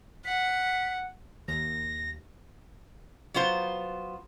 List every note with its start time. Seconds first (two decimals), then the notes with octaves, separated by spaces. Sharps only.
0.25 F#5 B6
1.48 D#2 A#6
3.34 F#3 B3 F4 C5